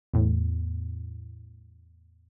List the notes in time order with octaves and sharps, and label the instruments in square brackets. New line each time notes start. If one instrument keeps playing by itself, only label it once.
[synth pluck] E2 A2